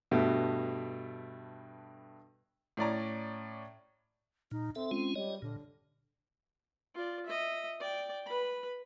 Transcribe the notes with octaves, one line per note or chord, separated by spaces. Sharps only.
G2 B2 A3
A2 C#4 D5 A#5
A#2 D#4
C4 A4 E5
G#3 C#4 F4
G3 C#5 D#5
A#2 D3
F4 D5
D#5 E5
D5 G5
B4 B5